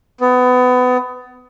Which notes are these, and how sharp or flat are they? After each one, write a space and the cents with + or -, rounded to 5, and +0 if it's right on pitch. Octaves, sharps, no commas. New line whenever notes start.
B3 +25